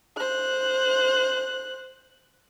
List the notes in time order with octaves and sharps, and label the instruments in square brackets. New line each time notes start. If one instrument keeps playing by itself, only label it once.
[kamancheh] C5 F#6